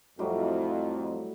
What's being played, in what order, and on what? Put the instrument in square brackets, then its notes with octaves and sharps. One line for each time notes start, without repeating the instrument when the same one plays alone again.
[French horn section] F2 [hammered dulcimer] A2 F#3 G3